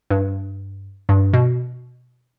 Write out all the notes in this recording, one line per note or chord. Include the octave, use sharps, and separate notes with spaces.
G2
G2
B2